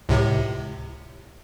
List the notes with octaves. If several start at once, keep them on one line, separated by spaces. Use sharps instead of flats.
C#2 A2 C3